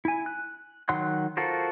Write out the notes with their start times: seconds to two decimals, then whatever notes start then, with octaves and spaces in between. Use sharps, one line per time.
0.05 E4 G#5
0.26 F#6
0.89 D#3 F#3 F#5 C6 F#6
1.37 F4 F#4 A4 A#4 C5